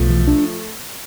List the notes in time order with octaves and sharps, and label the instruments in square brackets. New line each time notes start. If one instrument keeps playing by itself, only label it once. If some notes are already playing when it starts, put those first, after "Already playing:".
Already playing: [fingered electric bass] B1 [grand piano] F3 A3
[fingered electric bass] E3
D4